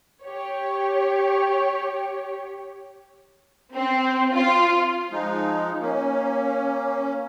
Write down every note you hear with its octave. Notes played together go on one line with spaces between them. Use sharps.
G4 C#5
C4
F4
F3 G#3 D#4
A#3 C#4